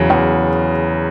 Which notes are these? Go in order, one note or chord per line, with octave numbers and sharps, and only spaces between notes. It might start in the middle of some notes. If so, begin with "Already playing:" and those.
Already playing: E2 C#3 F#3
E2